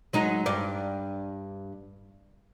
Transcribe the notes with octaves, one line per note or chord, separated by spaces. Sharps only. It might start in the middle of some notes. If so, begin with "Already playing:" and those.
F#3 G#3 D#4
G2 D5